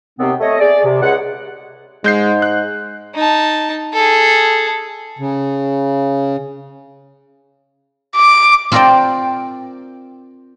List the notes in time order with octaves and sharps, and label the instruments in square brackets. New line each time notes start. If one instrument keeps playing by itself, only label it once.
[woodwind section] D#2 C3 B3 C4
A3 C#5 D#5
G#4 D5
C3
C#2 G#4 F#5
[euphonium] G#2 [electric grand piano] G#3 G6 C7
[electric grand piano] F#6
[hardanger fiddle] D#4 A5
G#4 A4
[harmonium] C#3
[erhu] D6
[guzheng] C4 F4 A#4 C5 D5 G5